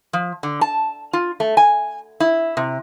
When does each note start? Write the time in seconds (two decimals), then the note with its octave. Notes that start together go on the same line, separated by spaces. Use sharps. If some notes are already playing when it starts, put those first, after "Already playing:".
0.13 F3
0.43 D3
0.61 A5
1.13 F4
1.40 A3
1.57 G#5
2.20 E4
2.57 C3